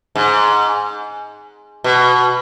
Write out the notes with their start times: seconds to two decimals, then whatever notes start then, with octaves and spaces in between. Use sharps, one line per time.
0.16 G#2
1.84 B2